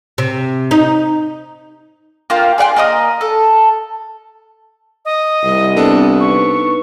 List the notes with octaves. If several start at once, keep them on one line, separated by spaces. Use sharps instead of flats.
C3
D#4
A#3 F4 G4
G#4 D5 F#5 C6
A#3 A#4 D#5 D#6
A4
D#5
C2 G3 C4
B3 D4 A4
D#4 B4 C#6